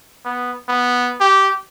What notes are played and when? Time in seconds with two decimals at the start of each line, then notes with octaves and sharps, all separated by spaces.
0.25 B3
0.68 B3
1.20 G4